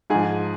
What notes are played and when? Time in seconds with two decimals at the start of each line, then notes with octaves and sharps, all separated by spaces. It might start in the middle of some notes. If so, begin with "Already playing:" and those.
0.10 G#2 F3 G#4